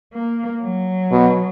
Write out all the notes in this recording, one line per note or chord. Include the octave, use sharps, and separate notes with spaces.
A#3
F#3
B2